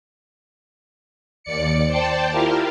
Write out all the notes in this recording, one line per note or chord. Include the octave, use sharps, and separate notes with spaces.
D#2 D5 C#7
C5 D5 G5 A5
E4 F4 G4 A#4 F5